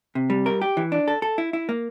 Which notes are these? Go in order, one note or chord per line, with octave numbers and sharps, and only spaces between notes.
C3
G3
A#4
G4
E3
D4
A4
A4
E4
E4
A#3